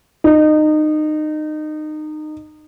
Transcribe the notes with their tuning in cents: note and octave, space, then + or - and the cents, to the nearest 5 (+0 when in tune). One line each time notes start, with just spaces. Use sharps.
D#4 -25